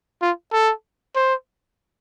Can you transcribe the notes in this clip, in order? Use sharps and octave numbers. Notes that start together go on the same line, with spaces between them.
F4
A4
C5